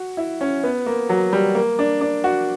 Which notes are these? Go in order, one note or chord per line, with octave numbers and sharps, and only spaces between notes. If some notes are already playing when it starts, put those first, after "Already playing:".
Already playing: F#4
E4
C#4
B3
A#3
F#3
G3
A#3
D4
D4
F#4